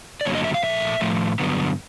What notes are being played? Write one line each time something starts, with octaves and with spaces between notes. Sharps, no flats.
D5
G2 D3 F#3 A#3 C#5
D#5
E5
F5
A#2 F3 A3 E5
A2 F3 A3
G2 D3 F#3 B3